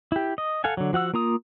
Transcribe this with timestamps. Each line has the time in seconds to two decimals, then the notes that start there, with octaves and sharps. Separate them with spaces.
0.12 E4 G4
0.38 D#5
0.64 A4 F5 F#5 G#5
0.77 D3 F#3
0.93 F3 F#4 F#5 E6
1.14 A#3 F4 A#5 D#6